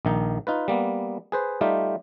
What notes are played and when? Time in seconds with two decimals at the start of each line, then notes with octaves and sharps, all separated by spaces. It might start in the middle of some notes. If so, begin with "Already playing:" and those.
0.05 A#1 D#3 D#4
0.47 D#4 F4 B4
0.68 G3 A#3 B3
1.32 G#4 B4 C5
1.61 G3 A3 D#4 F4 G4